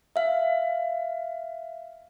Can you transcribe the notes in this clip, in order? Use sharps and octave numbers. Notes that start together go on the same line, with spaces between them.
E5 F5